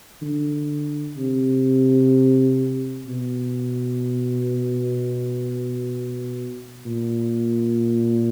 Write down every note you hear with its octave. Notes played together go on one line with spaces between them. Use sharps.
D3
C3
B2
A#2